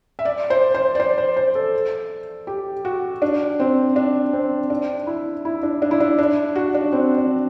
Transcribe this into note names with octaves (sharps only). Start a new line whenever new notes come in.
E5
D5
C5
C5
D5
C5
C5
C5
A4
G4
F#4
D4
C4
D4
C4
D4
E4
E4
D4
D4
E4
D4
D4
F#4
D4
C4
D4